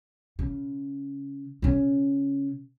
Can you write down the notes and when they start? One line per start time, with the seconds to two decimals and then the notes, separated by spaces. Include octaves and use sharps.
0.39 C#3
1.62 C#3 C#4